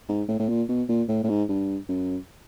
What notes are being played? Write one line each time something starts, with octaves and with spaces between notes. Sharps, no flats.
G#2
A2
A2
A#2
B2
A#2
A2
A2
G#2
G2
F#2